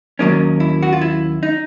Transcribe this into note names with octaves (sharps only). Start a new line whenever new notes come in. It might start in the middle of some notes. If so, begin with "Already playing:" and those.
D#2 D#3 F#3 A#3 C#4 D#4
E4
F#4
F4
E4
D#4